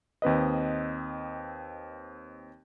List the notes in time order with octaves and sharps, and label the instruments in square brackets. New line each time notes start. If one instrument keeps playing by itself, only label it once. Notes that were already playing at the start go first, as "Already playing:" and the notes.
[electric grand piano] D#2 C4 B4 D#5